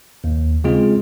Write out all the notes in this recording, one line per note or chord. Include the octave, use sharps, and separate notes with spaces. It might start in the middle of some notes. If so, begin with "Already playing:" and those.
D#2
C#3 G#3 C4 F4 G#4